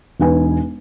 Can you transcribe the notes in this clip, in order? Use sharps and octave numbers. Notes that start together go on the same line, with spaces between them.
E1 D#4 B4 G#5